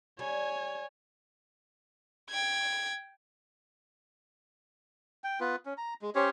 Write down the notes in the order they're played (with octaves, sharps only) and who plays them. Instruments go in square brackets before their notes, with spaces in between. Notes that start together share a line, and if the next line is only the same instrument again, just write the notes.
[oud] G3 [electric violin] C#5 G#5
[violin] G5 G#6
[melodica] G5
B3 F4 B4
C#4
A#5
G#3
C#4 G4 C5 C#5